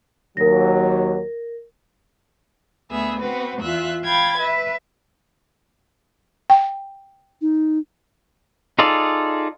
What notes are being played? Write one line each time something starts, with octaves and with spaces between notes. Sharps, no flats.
D#2 F#3 A#4 A#6
D2 B3 G#4 E5
B3 C4 F#4 B4
E2 F4 E5 F#6
F5 G5 B5 G#6 A6
B4 E5
G5
D#4
D#4 F4 G#4 A4 D5